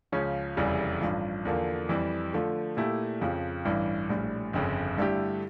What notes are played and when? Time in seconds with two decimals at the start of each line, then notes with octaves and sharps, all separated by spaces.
0.12 C#2 C#3 F3 C#4
0.57 F1 E2 C#3 E3 G3
1.01 A1 G2 F3
1.45 E2 D3 F3 A#3
1.89 F2 E3 G3
2.33 D3 F3 A3
2.77 A#2 A3 E4 G4
3.21 F2 C#3 F3
3.65 A1 G2 E3
4.09 A#1 A2 G3
4.53 G1 F2 C#3
4.98 G2 D3 A3 E4 G4